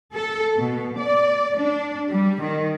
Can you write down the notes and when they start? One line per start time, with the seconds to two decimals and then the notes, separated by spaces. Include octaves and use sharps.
0.14 A4
0.58 B2
0.98 D5
1.59 D4
2.10 G3
2.44 D#3